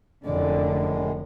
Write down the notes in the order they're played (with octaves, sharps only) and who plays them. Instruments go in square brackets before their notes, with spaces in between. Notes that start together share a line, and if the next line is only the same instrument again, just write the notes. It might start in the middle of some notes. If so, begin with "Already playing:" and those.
[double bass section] F1 [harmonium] F#2 A2 G#3 [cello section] D3 [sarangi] D5